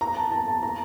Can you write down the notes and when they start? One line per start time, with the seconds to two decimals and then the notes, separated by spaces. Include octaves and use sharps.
0.01 A#5
0.17 A5
0.32 A5
0.48 A5
0.63 A#5